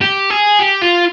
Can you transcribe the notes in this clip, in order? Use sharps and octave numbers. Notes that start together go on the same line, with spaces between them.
G4
G#4
G4
F4